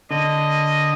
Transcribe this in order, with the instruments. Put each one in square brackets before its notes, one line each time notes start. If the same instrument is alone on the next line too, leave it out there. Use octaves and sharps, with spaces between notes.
[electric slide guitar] D3 [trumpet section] D#5